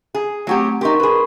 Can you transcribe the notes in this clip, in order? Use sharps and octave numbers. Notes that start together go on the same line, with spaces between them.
G#4
F#3 A3 C4 F#4 G4
D#4 G4 A#4 C6 C#6
G#4 B4